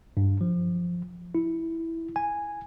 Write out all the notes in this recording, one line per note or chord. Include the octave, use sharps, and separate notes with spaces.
G2
F3
E4
G#5